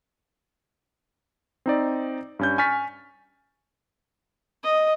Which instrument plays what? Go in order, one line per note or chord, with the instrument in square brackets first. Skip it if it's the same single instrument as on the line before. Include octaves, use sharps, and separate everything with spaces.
[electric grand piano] C4 D#4 D5
G2 C#4 G6
G#5 C#6 F6 A6 B6
[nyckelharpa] D#5